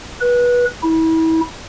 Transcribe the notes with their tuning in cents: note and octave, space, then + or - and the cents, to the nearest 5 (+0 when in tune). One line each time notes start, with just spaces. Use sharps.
B4 -25
E4 -30